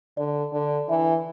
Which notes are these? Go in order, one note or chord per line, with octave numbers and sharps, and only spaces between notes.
D3 D5
D3
E3 E5